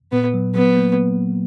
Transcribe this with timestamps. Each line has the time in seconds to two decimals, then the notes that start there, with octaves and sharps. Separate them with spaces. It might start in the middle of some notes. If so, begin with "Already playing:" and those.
0.12 A#2 B3
0.34 F#3
0.55 F#3 B3
0.77 A#3